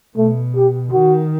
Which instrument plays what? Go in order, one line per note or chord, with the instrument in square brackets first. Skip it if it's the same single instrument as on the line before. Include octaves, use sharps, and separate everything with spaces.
[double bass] B2 [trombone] A3
[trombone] G4
[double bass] D#3 [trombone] F#4